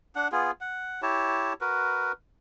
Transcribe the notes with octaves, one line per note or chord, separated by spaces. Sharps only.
D4 F#5
B3 F4 G#4
F#5
E4 G4 C#5 A5
F#4 A#4 B4